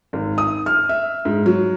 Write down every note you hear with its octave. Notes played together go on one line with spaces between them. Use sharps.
G#1
D#6
F6
E5
G#2
F#3